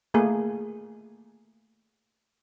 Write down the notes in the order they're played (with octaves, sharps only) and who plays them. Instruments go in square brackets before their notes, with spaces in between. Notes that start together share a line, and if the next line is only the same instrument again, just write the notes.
[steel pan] A3 A#3 G#4